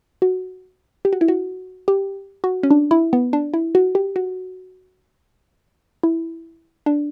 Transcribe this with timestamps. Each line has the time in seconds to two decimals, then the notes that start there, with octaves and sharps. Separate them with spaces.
0.22 F#4
1.05 G4
1.13 F#4
1.21 E4
1.28 F#4
1.88 G4
2.44 F#4
2.63 C#4
2.71 D4
2.91 E4
3.13 B3
3.33 D4
3.54 E4
3.75 F#4
3.95 G4
4.16 F#4
6.03 E4
6.86 D4